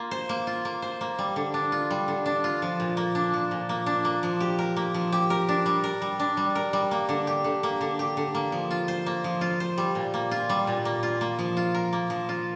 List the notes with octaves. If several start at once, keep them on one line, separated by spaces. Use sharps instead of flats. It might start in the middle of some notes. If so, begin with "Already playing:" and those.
Already playing: A#3 F4
C5
A#3
F4
A#3
C5
A#3
G3
D3
D4
F4
G3
D3
D4
F4
F3
A#2
A#3
D4
F3
A#2
A#3
D4
A#3
F3
G4
A#4
A#3
F3
G4
A#4
D4
G3
A#4
G3
D4
G3
A#4
G3
A#3
D3
G4
D3
A#3
D3
G4
D3
A#3
F3
F4
C5
A#3
F3
F4
C5
G3
A#2
A#3
F4
G3
A#2
A#3
F4
A#3
F3
F4
A#4
A#3
F3
F4